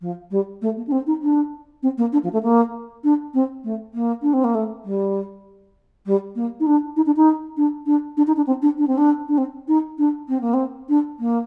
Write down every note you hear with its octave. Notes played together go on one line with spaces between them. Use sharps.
F3
G3
A3
A#3
D4
C4
D#4
D4
C4
A#3
D4
F3
A3
A#3
D4
C4
A3
A#3
D4
C4
A#3
A3
G3
G3
A#3
D#4
D4
D#4
D4
D#4
D4
D4
D4
D#4
D4
C4
D4
D4
C4
D4
D4
C4
D#4
D4
C4
A#3
C4
D4
A#3